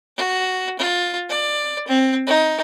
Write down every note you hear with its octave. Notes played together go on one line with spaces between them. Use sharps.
F#4
F4
D5
C4
D#4